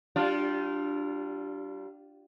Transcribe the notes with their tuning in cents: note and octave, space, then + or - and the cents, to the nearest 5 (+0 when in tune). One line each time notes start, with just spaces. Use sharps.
G3 -30 D4 +0 F4 +0